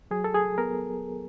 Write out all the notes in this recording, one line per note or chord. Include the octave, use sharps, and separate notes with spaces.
F#3 G#4
A4
G#4
B3 A#4